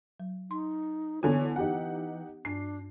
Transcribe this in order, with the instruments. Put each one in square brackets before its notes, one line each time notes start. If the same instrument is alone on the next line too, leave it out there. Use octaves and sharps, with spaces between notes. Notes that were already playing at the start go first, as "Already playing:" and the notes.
[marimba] F#3
[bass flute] D#4 [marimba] C6
[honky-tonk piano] D3 E3 G#5 [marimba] B3 E4 [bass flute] C#5
[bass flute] E3 [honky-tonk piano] D#4 G4 F#5
[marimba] G2 [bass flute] D4 [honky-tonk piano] C7